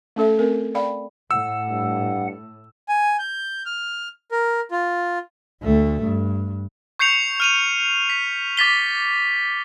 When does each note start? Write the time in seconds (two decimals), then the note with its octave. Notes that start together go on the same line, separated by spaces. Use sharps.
0.16 A3 C#4 A4 E5
0.39 A3 C4 A#4
0.74 D5 F5 G5 B5
1.31 A2 F#5 E6
1.70 G2
2.89 G#5
3.19 G6
3.66 F6
4.32 A#4
4.71 F4
5.63 D2 A3
6.03 G2
6.99 C#6 G6 C7 C#7 F7
7.40 F6 D#7 F7
8.10 B6
8.57 D6 A6 B6 G7